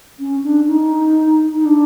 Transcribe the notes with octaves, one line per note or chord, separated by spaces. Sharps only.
C#4
D4
D#4
D#4
D4